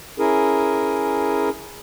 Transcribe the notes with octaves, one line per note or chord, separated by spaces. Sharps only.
C#4 E4 G#4 A#4